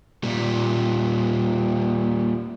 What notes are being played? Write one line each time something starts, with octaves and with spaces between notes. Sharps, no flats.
A#2 G3